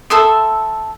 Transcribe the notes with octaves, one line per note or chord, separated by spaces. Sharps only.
A4 E5 C6 D#6